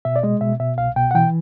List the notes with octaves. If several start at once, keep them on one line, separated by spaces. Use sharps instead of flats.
B2 E5
D5
G#3 D#5
B2 E5
B2 E5
C2 F5
B2 G5
F#5
E3 G5